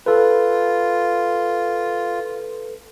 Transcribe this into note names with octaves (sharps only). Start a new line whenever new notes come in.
F4 A4 B4